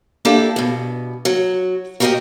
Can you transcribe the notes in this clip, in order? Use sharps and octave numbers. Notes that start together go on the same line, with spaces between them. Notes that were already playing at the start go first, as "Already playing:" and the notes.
A#3 D4 E4 G4 A4 G5
G2 B2
F#3
F#4 G4 A#4 D5 D#5 G5